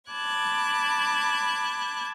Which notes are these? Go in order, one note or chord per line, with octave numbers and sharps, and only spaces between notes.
A5 B5 D6 F#6 G#6